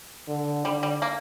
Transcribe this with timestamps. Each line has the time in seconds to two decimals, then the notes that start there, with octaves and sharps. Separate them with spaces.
0.28 D3
0.65 D3 G3
0.83 G3
1.02 A#3